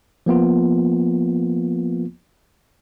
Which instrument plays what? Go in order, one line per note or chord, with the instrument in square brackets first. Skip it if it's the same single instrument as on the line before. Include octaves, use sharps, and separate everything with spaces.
[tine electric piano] F3 A#3 B3 F4